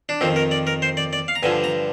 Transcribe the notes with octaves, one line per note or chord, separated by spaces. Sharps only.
D4
F2 D#3 C4
A#4
D5
A#4
C5
D5
D5
F5
A#5
G2 D3 F3 G#5
A#5